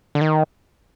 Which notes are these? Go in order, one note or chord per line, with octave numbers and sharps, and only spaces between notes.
D3
D#3